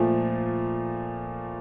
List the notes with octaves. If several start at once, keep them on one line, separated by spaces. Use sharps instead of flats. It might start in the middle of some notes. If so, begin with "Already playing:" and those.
Already playing: A#2 F3 A3